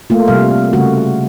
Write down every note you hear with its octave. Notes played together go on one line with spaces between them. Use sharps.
A3 A#3 F4
C3 G3 F5
C#3 G3 A3 F#4